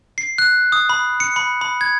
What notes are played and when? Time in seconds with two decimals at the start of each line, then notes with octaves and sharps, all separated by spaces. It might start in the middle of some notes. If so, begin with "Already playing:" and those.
0.18 C7
0.38 F#6
0.72 D#6
0.89 B5
1.20 C#7
1.36 B5
1.61 B5
1.81 G#6